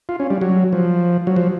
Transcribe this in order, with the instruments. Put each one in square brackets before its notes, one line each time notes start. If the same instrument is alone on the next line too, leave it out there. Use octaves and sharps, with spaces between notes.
[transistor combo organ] F4
C#4
G3
F#3
F3
F#3
F3